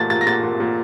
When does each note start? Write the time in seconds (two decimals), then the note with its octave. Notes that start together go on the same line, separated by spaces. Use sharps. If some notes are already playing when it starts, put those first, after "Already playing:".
Already playing: A#2 A3 A6
0.10 A#2 A6
0.21 A#6
0.27 A#2 A6
0.43 A#2
0.60 A#2